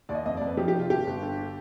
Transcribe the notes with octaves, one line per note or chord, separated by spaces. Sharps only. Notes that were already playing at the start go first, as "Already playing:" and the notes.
D#2 D5
D#5
F2 D#5
D5
F2
B4
F3 G4
G4
C3
F4
G1 G4
G1
D3